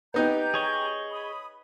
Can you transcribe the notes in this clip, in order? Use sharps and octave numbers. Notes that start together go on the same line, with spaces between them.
B3 D#4 G4 A#5 G6
G#4 C#5 D#5
B5 D#6